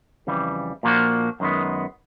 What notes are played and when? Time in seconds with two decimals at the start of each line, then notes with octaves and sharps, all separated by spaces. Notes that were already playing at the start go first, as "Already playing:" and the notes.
0.27 F2 C#3 E3 G3
0.83 A#2 F3 A#3 D4 F#4
1.40 F#2 D#3 G#3 B3